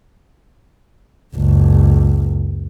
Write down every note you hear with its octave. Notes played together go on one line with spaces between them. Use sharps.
F#1 C#2